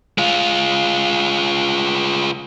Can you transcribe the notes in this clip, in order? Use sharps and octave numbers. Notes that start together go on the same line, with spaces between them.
G#3 F4